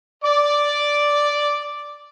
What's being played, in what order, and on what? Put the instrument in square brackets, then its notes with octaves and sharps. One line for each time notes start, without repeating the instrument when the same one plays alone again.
[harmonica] D5 D6